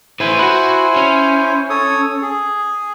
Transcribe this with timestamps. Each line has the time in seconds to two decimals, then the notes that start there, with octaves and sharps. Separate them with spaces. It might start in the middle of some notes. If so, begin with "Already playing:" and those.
0.20 A2 E4 B4 C5 G#5
0.39 F#4 F#5
0.96 C#4
1.70 A4 C#5 D#6
2.22 G#4